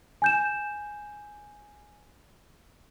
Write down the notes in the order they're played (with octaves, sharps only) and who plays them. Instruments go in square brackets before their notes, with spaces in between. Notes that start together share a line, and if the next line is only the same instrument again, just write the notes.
[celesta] G#5 G6 E7